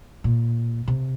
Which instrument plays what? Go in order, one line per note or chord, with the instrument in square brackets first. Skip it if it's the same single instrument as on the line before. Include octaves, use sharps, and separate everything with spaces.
[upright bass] A#2
C3